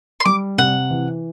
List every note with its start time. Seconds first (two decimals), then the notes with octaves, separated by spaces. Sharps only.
0.20 C6
0.26 G3 D6
0.58 C3 F#5
0.90 E3